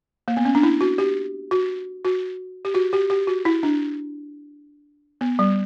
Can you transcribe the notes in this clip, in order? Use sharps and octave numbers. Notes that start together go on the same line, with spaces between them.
A#3
B3
C#4
D4
E4
F#4
G4
F#4
F#4
G4
F#4
G4
G4
F#4
E4
D4
B3
G3